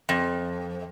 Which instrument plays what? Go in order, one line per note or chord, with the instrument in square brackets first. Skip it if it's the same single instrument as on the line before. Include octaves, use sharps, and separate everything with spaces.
[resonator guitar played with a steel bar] F2